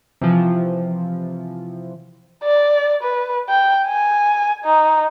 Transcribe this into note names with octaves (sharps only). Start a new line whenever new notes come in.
C3 E3 F3
D5
B4
G5
G#5
D#4